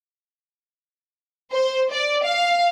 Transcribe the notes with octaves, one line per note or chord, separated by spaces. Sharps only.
C5
D5
F5